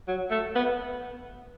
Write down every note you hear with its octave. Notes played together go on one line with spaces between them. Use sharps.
F#3
A3
B3